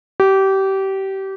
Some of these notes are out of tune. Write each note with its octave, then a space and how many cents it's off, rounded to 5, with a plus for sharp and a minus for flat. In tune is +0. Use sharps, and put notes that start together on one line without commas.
G4 -25